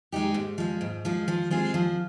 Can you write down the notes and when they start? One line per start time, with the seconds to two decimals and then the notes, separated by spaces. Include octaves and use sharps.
0.12 G#3 D#4 G4
0.34 G#2
0.58 F3 G#3
0.81 G#2
1.05 F3 G#3
1.28 F3
1.50 G#3 C4 F4 G#4
1.74 F3